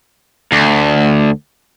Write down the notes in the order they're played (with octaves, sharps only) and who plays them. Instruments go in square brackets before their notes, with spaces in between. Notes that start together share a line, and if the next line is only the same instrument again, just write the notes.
[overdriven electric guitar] D2